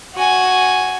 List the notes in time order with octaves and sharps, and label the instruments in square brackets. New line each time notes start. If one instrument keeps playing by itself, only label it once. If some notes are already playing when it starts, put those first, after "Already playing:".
[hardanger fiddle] F#4 G#5